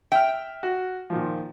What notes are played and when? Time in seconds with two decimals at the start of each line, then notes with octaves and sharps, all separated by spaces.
0.12 E5 G5 F6
0.63 F#4
1.10 A#2 D#3 F3